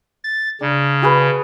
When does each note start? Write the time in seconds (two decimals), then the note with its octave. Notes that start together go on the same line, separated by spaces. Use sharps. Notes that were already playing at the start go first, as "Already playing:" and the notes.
0.24 A6
0.61 C#3 D4
1.02 F#4 G#4 B4